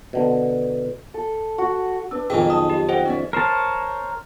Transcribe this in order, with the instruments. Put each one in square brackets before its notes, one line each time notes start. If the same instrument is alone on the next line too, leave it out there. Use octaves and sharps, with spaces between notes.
[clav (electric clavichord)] B2 D3
[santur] A4
F#4
[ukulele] D4 [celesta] B4 E6
[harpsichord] B1 F2 D#3 [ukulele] D4 A#4 [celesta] G#4 [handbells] G5 G#5
[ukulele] A5 [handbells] D#6
[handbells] G4
[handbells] C5 [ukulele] D#5 F#5 G5
[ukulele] C#4 D5 E5
[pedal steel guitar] A#4 C5 C#5 A5